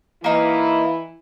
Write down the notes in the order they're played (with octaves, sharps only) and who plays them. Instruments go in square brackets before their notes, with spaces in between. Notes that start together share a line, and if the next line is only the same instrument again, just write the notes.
[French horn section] E3 E4 [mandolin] A#3 D#4 F5